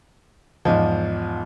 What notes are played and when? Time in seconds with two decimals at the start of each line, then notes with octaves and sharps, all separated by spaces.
0.65 E2 G#2 F3 D#5